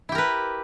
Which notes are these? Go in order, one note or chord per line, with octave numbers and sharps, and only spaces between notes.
E4 G4 A#4 B4